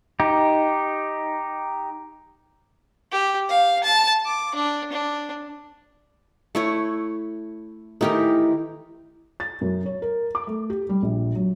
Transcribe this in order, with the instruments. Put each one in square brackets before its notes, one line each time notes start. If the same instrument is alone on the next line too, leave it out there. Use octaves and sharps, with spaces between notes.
[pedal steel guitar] D#4 G4
[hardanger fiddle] G4
F5
A5
D6
D4
D4
[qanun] A3 E4 C#5
[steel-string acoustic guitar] D#3 E3 A3 [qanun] D#4 G4 A#4
[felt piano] A6
F#2
C#5
A#4
D6
A3
G4
G3
A#1
F#3